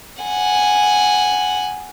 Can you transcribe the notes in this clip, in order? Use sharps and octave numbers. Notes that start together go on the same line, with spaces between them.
F#5 G#5